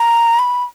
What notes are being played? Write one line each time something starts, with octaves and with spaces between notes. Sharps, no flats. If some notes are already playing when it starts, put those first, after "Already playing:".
Already playing: A#5
B5